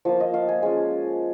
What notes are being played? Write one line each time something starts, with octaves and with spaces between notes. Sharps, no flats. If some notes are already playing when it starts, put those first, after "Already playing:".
F3 A#3 F4 F5
D#5
F5
G#5
G#3 C#4 F4